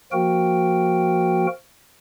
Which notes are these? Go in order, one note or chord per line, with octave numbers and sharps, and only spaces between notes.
F3 A#3 F#4 A#4 G5